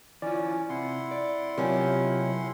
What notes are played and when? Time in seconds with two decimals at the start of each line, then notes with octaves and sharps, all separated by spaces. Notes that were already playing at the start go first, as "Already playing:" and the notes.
0.22 E3 C#4 F4 D5
0.69 C3 E4 F#5 C6
1.11 D5
1.58 C3 D#3 F#3 C#4 F4 G4